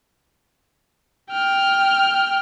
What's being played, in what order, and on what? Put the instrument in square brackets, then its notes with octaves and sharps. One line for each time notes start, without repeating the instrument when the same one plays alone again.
[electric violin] G5 F6